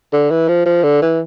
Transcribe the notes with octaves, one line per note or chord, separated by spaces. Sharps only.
D3
E3
F3
F3
D3
E3